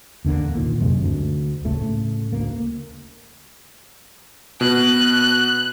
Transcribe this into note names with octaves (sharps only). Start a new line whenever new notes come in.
E2 D3 A3 A#3
A#2 D3 D#3
F#2 C3 G#3
D2
A2 C#3 A3
D2 A#3
B2 F#6